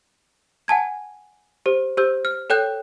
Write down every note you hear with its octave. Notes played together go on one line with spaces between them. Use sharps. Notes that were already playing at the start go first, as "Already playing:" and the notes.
F#5 G#5 A5 G#6
G4 C5
G4 C5 E6 G6
F6
A4 C#5 G5 F#6 G6